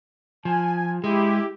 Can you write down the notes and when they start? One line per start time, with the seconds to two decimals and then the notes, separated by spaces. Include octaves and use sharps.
0.45 F3 G#5
1.04 G#3 E4 G4